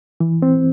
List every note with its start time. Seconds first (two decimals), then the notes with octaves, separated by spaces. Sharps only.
0.20 E3
0.42 C4